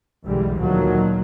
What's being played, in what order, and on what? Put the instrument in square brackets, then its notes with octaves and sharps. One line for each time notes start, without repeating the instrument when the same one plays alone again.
[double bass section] B1 E2 D3 E3 G3 G#3
D2 A#2 D#3 F3 F#3 A#3